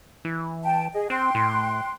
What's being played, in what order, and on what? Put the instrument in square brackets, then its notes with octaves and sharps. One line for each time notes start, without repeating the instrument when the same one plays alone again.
[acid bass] E3
[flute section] G5 A5
G#4 D#5
[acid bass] C4 [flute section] G5 C6 F#6
[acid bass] A2